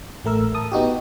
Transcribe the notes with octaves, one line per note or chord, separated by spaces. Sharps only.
A1 A3 A#4 E6
A5 D#6
B3 D#4 F#4 G4